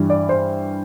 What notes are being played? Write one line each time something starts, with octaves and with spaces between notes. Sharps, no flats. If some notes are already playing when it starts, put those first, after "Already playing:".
Already playing: G2 E3 G3
D5
C5